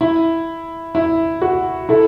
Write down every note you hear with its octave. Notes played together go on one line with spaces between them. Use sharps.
E4
E4
F#4
E4 A4